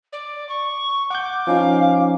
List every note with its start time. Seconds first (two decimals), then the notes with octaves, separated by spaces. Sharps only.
0.12 D5
0.49 C#6
1.10 F#5 D6 G6
1.47 F3 C#4 D#4 F5